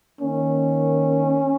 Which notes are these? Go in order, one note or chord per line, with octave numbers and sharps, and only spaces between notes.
D#3 A#3 C#4